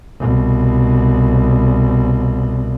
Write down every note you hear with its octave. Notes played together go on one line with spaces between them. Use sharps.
C2 B2